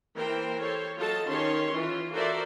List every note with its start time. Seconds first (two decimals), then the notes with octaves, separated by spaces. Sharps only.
0.17 E3 A#3 A#4 C5 G5
0.61 G4 A4 C5 C#5
0.97 F#3 F4 A4 D#5 A5
1.28 D#3 C#4 G4 C#5 C6
1.74 E3 F4
2.13 F#4 A4 A#4 C5 D5 E5